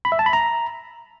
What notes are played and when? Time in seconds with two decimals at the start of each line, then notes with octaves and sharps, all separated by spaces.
0.05 B5
0.12 E5
0.19 A5
0.26 B5
0.33 A#5